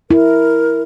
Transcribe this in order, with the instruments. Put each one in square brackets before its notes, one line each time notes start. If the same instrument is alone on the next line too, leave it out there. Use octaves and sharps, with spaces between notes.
[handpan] E4 [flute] A#4